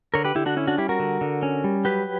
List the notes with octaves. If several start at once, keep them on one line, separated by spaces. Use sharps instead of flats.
D3 A#4 C#5
G4 B4
D3 E4 G4
D4 F#4
C#4 E4
D4 F#4
G3 E4 G4
F#4 A#4
D3
D3
C#4
G3
F#3 G4 B4